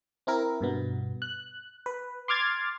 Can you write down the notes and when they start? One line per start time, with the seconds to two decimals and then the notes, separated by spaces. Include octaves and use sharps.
0.27 C4 E4 A#4
0.61 G2 B2 B3
1.22 F#6
1.86 B4
2.28 C6 D6 F6 G#6 A6